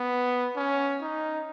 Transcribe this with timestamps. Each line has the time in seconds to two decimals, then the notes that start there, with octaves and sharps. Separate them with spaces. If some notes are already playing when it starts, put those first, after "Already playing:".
Already playing: B3
0.56 C#4
1.01 D#4